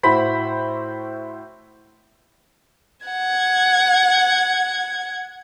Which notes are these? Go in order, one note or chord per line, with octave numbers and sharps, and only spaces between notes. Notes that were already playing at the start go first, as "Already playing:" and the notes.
A2 E4 F#4 C5 B5 B6
F#5 G#6